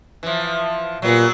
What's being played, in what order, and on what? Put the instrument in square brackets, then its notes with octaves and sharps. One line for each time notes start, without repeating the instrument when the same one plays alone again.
[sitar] E3 F3
[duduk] A#2 [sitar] F#3 G3 B3